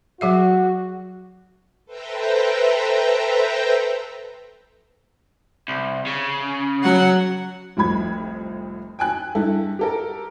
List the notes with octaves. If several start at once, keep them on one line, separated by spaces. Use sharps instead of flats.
F#3 F#4 G#4 E5
A4 B4 C5 E5 G5 A#5
C2
C#3
F#3 F#5
F1 C2 F2 B5 G#6
G5 G#5 F#6
G2 E4 A4
G4 A4 A#4